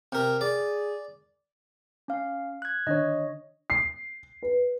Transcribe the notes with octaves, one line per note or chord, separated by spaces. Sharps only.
C3 A#4
G#4 D5
C#4 F5
F#6 G#6
D3 D#3 D4 C#5 D#5
C7
B4